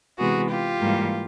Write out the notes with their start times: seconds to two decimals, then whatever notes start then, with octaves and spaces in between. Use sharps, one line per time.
0.19 C3 E3 G#3 B3 F#4 G#4
0.50 F4 G4
0.81 G#2 E3 G3 A#3